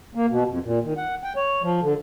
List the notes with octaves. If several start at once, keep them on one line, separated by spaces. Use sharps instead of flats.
A#3
B2
F2
A#2
D#3
F#5
G5
C#5
F3
D3